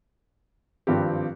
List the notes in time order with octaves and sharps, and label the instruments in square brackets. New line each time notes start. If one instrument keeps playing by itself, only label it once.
[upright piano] G#1 G2 F3 C4 G4